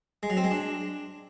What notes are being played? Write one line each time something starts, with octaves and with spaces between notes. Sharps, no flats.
G#3
F#3
C4
G#3
D4